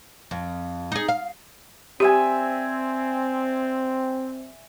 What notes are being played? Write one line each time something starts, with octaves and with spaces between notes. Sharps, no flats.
F2
D#4 G#4
F5
C4 G4 D5 E5 G#5